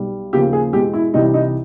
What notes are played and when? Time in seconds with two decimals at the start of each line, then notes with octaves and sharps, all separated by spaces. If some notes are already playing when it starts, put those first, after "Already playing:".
Already playing: B1 B2 G3
0.33 D#2 C#3 F3 A#3 G4
0.53 G#4
0.73 E2 B2 G#3 G4
0.93 E4
1.14 C2 C3 E3 G3 D#4
1.34 D#4